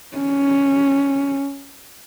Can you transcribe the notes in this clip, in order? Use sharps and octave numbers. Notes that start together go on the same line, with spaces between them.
C#4